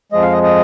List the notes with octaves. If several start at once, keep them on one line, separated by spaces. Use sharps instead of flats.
F2 F3 G#3 D#5
F5
D#5
D#5